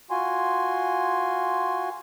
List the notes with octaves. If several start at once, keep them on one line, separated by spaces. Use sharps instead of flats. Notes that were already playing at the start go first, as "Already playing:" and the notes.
F4 F#4 G#5 C6